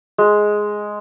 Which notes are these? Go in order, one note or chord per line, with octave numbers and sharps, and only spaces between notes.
G#3